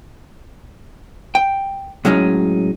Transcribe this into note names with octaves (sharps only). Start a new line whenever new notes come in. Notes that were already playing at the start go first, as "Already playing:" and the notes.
G5
A2 F#3 G#3 C#4 D#4